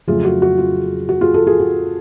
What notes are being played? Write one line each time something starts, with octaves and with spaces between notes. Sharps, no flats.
F2 C#3 F#3 A3 F4 G#4
F#4
F#4
F4
F#4
F4 G#4
F#4 A4
F4 G#4
F#4